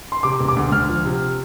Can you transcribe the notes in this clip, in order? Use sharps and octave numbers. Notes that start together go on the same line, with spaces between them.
C6
C3 D6
E1
D6
D2
D2 F6
F3
C3